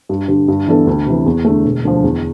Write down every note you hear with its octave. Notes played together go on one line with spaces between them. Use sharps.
G2
D3 G3
G2
E3 B3 D4 A4
D2
C3 E3
E2
D3 A3
E1
D2 D3 F3
E2